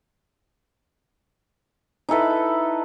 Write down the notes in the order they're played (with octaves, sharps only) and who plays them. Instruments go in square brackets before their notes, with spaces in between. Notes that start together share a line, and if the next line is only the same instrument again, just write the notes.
[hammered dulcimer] D#4 E4 A4 B4